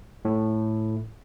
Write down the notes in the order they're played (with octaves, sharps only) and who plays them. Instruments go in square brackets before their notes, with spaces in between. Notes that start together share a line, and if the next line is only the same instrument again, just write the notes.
[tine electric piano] A2